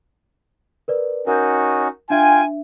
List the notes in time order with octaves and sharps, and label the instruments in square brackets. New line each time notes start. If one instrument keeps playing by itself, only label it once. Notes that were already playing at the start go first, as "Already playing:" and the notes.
[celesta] A#4 B4 D5
[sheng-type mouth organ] C#4 D#4 F#4 [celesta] A#4 G6
[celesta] D4 E5 [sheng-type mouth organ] F4 G5 [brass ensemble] G#5